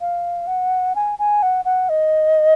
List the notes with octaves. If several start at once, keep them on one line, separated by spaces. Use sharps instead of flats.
F5
F#5
G#5
G#5
F#5
F#5
D#5